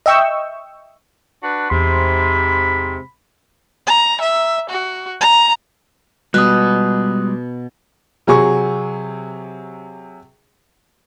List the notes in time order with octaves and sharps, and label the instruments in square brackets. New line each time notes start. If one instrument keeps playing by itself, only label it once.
[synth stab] D#5 E5 G5 C#6 E6
[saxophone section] D4 F#4 B4
[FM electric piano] E2 C6 [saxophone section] G#2 C3 [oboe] B5
[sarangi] A#5
E5
F#4
A#5
[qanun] B2 [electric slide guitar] G3 G#3 F4 [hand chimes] D#6 F#6
[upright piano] C3 F#3 G#4 C#6